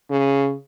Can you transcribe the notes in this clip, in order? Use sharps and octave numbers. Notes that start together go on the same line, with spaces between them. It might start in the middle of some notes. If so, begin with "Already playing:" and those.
C#3